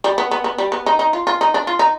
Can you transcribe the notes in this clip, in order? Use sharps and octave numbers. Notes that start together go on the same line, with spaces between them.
G3
B3
B3
B3
G3
B3
D#4
D#4
F4
F4
D#4
D4
F4
D#4